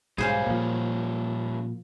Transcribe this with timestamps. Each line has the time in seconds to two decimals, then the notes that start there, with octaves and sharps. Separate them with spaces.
0.18 B1 G#2 G3 C#4 G#4 C5 F5
0.46 A#2 F3